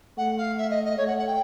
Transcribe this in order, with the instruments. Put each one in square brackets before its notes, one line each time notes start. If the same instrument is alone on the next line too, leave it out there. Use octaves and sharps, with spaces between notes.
[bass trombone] A3 [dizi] F#5
[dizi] F5
E5
D#5
D#5
[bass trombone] A3 [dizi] C#5
[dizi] F#5
F#5
G5